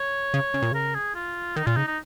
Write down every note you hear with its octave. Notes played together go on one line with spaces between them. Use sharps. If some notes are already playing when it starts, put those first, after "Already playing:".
Already playing: C#5
C#3
C#3
A#2
C#3 A#4
G#4
F4
D#3 D#4
A#2 F4
C#3 D#4
D#4